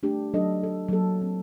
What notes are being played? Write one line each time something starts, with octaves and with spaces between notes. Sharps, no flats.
A3 D4 G4
F#3 D4 A4 D#5
A4
F#3 A#3 A4
C4